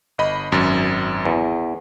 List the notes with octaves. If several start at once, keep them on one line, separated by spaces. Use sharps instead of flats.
G1 D#5 B5
G#1 F#2
E2